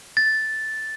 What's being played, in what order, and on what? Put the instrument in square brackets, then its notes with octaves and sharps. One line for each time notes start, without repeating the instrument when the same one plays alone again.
[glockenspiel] A6